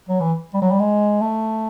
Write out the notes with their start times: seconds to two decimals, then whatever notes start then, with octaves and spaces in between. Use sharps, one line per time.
0.09 F#3
0.20 E3
0.54 G3
0.62 F#3
0.71 G3
0.80 G#3
1.21 A3